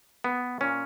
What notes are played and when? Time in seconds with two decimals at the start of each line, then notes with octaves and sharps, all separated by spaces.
0.24 B3
0.61 A#2 C#4